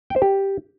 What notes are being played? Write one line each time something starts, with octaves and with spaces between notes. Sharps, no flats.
G5
C5
G4